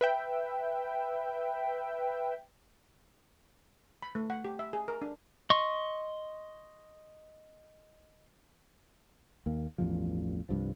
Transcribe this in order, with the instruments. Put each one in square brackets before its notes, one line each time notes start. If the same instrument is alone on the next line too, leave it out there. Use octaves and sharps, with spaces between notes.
[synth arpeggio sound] B4 E5 G5
[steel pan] B5
A3
F#5
G4
E5
G#4
A#4
D4
[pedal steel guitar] D#5 C6 C#6
[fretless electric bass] D#2 A#3
A1 E2 G2 F3
C2 G2 F3